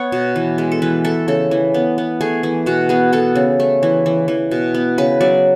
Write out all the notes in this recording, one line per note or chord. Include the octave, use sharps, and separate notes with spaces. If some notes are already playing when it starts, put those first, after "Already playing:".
Already playing: B3 C#5 F#5
B2
E3
G#3
A4
E3 B4
A3 A4
C#3 A4
E3
B3
B3
A3 G#4
E3 G#4
B2 F#4
B3 G#4
B3 A4
C#3
A3
E3
E3
E3
B2
B3
C#3 B4
F#3 D5